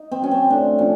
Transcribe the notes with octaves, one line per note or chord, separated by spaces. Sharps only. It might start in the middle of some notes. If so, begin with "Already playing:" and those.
Already playing: D#4
C4
F#3 C#4
C4
A2 D4
F3 C#4